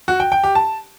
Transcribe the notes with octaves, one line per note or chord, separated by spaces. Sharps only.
F#4
G5
G5
G4
A5